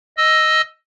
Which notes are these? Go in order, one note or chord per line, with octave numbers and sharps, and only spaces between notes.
D#5 E6